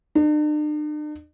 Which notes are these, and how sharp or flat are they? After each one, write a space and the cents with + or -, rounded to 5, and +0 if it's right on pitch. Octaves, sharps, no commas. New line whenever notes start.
D4 +45